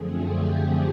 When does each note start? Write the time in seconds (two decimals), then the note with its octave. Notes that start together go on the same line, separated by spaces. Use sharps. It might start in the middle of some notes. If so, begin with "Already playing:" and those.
Already playing: F#2 D3 F3 A3 C4 G#4
0.27 G4